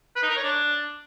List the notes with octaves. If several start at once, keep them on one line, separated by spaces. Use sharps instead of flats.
B4
D#4
A#4
C#5
D4